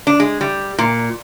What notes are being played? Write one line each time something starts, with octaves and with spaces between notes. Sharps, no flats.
D4
G#3
G3
A#2